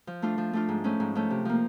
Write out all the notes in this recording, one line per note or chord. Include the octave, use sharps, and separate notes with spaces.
F3
A3 D4 F4
F3
A3 D4 F4
G#2
F3 A3 C#4
G#2
F3 A3 C#4
C3
F3 A#3